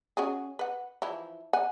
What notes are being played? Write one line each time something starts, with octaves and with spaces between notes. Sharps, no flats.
C#4 F#4 G#4
B4 F#5
E3 F3 E4
F#5 G#5